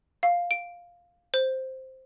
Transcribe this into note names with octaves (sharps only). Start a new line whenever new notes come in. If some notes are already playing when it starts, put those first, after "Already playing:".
F5
D7
C5